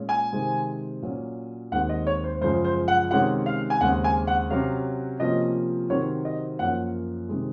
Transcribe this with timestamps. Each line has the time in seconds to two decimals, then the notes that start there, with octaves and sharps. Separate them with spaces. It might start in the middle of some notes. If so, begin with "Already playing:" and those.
Already playing: A#2 G#3 C#4
0.09 G#5
0.32 C3 D#3 G#3 C4
1.02 A#2 F#3 C#4
1.72 D#2 D#3 G#3 C4 F#5
1.89 D#5
2.07 C#5
2.24 C5
2.41 F#2 C#3 F3 G#3 C5
2.64 C5
2.88 F#5
3.11 C3 D#3 G#3 C#4 F#5
3.46 F5
3.70 G#5
3.81 D#2 C#3 G#3 C4 F#5
4.04 G#5
4.27 F#5
4.50 C3 F#3 C#4 F5
5.20 C3 F3 A#3 C#4 D#5
5.90 C3 D#3 F#3 C4 C#5
6.25 D#5
6.59 F#2 F3 A#3 C#4 F#5
7.29 C3 D#3 G#3